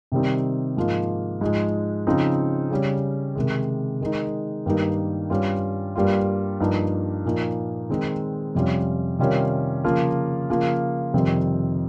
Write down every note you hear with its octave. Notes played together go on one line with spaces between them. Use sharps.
C3 D#3 G3 C4 D#4
G#2 F3 A#3 F4
G#2 F3 G#3
C#3 F3 C4 D#4
C#3 G3 C#4
C3 D#3 G#3
D#3 G#3 D#4
G2 D#3 G3 A#3 D#4
G2 G3 C#4 F4
G2 G3 A#3 F4
G2 F3 A#3 D#4
A#2 F3 A#3 D#4
D#3 G#3 C4 D#4
F2 C3 G3 C#4 F4
C3 D#3 G3 C#4 F4
C#3 F3 A#3 F4
C#3 F3 A#3 F4
F2 C3 D#3 G3 C4